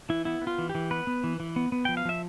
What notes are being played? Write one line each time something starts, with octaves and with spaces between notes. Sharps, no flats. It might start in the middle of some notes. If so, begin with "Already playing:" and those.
E3 E4
B3 E4
B3
F4
E3
G4
E3
B3 B4
B3
E3
E3
B3
B3
F3 G5
F5
F3 E5